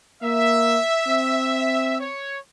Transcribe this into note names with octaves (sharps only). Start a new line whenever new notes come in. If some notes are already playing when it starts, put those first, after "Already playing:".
A#3 E5
C4
C#5